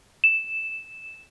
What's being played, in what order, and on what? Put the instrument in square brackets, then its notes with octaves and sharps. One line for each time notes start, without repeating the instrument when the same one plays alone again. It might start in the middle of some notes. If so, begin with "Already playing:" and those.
[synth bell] E7